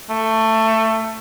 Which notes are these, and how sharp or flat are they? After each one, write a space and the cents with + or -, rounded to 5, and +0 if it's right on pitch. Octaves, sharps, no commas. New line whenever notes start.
A3 +15